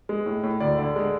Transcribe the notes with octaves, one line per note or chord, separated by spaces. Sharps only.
G#3
A2
A2
D2 D5
D3
G#3